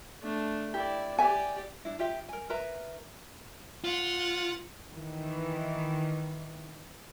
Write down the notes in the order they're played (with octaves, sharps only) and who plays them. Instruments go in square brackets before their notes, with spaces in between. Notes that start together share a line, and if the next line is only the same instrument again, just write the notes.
[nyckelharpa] A3 D4
[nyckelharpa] E4 D5 [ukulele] G4
[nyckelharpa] G4 D5 [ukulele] E5 G#5
[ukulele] D4 E4
F4 G4 E5 G5
A#4 G#5
A#4 B4 E5 A#5
[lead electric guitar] F4 [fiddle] F#5
[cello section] D#3 E3